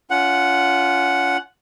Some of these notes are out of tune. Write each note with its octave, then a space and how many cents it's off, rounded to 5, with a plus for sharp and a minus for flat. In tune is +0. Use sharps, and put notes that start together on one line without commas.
C#4 +30 F4 -15 F#5 +0